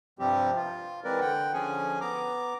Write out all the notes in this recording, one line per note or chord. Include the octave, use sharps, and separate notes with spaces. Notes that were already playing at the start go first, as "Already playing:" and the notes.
G2 C3 F3 G3 C4 G4
F4
E3 G#3 C4 A#4 B4 D5
D3 F#5 G5
D3 F3 C#4 G#4 G#5
B3 A#5 D6